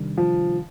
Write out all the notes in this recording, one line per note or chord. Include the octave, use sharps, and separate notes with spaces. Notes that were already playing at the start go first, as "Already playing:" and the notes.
Already playing: C3 D#3 G3 D4
F3